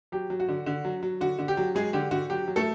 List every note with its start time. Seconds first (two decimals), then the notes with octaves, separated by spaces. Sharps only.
0.12 F#3 G4
0.30 F#3
0.40 F#4
0.48 D3
0.66 D3
0.85 F#3
1.03 F#3
1.21 D3 F#4
1.39 D3
1.48 G4
1.57 F#3
1.75 F#3 G#3 G#4
1.93 D3 G4
2.11 D3 F#4
2.30 F#3 G4
2.48 F#3
2.56 A3 A4